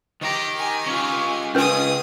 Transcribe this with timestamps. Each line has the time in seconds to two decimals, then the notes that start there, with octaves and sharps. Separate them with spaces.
0.21 D#3 G4 A#5
0.56 G4 G#5
0.86 C#4 F4
1.55 C#2 C#4 G#4 B4 D#6